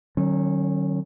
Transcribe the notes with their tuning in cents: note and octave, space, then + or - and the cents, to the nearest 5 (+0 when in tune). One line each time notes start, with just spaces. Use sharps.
D#3 -45 F#3 +25 C#4 -20